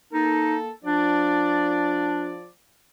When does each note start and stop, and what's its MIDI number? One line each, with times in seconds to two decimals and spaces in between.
0.13 0.71 58
0.13 0.57 63
0.13 0.71 69
0.84 2.50 53
0.84 2.38 62
0.84 2.50 65
0.84 2.50 74